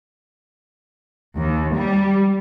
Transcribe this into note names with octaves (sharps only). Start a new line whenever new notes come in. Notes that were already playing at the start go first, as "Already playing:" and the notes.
D#2
G3